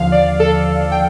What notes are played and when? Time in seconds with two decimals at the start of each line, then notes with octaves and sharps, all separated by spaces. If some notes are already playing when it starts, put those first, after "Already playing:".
Already playing: D#2 D3 F3 F5
0.12 D5
0.40 A4
0.92 G5